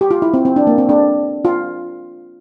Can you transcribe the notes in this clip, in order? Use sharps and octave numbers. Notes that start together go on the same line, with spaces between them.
G4
F4
E4
C4
C4
D4
A#3
C4
D4
F4